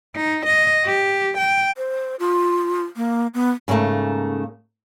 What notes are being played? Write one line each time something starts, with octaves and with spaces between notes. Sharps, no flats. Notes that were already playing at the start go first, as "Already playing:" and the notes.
D#4
D#5
G4
G5
C5
F4
A#3
B3
G#2 C#3 G3 A3 A#3